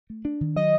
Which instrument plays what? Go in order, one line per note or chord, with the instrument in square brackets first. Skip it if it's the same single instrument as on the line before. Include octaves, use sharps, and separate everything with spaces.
[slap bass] A3
D4
D#3
[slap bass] F#3 [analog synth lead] D#5